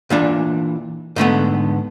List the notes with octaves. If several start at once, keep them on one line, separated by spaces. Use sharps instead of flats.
A#2 E3 D4
G#2 D3 A3 B3